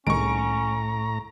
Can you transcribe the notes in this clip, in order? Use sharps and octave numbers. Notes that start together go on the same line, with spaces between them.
C2 A2 D#3 G#3 C#4 A#5 C#6 D7